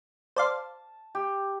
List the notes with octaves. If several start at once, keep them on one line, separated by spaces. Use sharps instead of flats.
C5 D5 F5 A5
G4